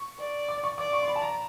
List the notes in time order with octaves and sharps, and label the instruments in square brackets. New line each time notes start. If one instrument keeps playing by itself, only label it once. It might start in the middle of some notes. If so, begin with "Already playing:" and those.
Already playing: [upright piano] C#6
[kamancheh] D5
[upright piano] D6
C#6
[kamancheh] D5 [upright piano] D6
[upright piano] C#6
C6
B5
A5
A#5